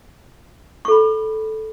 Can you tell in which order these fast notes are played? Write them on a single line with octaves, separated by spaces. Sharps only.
C#6 A4 B5